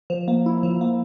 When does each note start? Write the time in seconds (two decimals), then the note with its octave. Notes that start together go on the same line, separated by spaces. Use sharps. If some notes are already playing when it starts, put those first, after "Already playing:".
0.10 F3
0.28 A#3
0.46 E4
0.63 F3
0.81 A#3